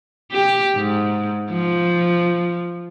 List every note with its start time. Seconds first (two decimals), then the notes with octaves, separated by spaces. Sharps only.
0.32 G4
0.76 G#2
1.51 F3